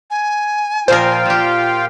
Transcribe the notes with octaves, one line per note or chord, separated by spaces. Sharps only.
G#5
A#2 F3 F4 A#4 C5 F5 G5
A#2 G4